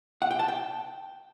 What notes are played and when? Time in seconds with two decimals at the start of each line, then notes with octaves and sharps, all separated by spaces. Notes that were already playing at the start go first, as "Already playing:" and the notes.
0.22 F#5
0.31 G5
0.39 A5
0.48 G5